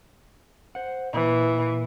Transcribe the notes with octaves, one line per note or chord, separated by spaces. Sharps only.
C5 F#5
A#2 E3